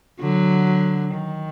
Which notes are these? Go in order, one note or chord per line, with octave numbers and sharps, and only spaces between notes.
D3 F#3
D#3